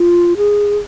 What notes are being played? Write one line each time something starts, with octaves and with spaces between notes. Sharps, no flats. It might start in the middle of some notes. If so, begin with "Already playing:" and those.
Already playing: F4
G#4